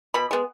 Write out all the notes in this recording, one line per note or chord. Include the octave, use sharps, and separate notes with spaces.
B2 B5
G#3 B3